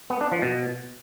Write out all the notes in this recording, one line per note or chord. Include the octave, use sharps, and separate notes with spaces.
B3
D4
F3
B2